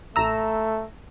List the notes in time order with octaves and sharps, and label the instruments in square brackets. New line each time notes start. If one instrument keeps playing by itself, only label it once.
[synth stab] A1 A#5 E6 [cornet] A3